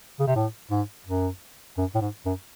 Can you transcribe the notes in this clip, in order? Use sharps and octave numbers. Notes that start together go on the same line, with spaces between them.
C#3
C3
A2
G#2
F#2
F#2
A2
G#2
F#2